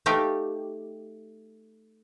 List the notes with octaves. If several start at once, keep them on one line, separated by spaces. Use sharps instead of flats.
A3 D#4 G4 F5 G5